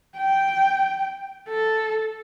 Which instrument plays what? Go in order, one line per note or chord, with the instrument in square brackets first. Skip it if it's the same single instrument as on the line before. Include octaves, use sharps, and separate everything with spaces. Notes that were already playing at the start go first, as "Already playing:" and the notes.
[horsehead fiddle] G5
A4